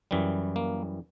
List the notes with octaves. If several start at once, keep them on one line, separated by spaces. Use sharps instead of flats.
F#2 E3 G3
A#3